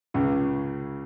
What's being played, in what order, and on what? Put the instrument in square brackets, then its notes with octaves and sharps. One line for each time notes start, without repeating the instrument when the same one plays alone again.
[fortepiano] C#2 C#3